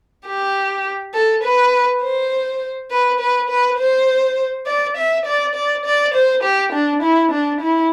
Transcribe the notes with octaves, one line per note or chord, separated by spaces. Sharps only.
G4
A4
B4
C5
B4
B4
B4
C5
D5
E5
D5
D5
D5
C5
G4
D4
E4
D4
E4